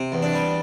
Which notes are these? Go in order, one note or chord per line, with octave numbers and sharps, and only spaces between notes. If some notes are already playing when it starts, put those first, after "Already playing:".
Already playing: C3
E2
D4
G3